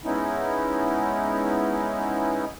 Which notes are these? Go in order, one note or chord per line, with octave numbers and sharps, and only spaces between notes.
G#3 B3 C#4 D#4 E4